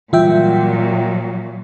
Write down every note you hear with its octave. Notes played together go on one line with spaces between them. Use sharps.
A#2 E3 F#3 G3 F4 E5 G5